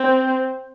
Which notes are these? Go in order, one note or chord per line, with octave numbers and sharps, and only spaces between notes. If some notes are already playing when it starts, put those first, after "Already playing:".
Already playing: C4